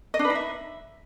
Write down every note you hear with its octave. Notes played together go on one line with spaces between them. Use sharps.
D#5
D4
B4
D#4
E5